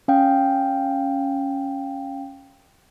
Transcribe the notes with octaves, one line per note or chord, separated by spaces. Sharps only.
C#4 F5 G5